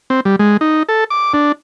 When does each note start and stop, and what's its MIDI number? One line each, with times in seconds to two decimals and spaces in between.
0.10 0.20 60
0.25 0.36 55
0.39 0.57 56
0.61 0.83 63
0.89 1.04 69
1.10 1.33 86
1.34 1.52 62